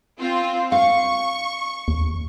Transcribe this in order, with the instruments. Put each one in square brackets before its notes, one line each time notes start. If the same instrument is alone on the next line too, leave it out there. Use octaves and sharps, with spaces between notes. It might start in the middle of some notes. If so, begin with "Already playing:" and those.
[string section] C4 F4
[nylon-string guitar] F5 [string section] C#6
[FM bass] D#2